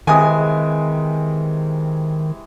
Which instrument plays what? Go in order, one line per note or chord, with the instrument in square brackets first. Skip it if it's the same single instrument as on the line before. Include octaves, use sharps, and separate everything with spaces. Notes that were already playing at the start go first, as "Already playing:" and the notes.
[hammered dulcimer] C3 E3 G#3 [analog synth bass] D#3 [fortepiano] G#5 D#6